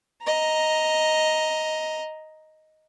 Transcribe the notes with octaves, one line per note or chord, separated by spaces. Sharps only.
D#5 A#5